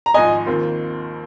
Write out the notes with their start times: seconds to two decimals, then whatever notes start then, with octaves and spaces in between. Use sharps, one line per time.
0.06 A#5
0.14 G#1 G#2 F3 D#5 G#5
0.46 D#2 D#3 C4 F4